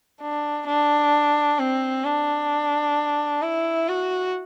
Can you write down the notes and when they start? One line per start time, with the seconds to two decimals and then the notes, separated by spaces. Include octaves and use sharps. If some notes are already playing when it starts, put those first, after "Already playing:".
0.21 D4
0.67 D4
1.59 C4
2.05 D4
3.42 E4
3.88 F#4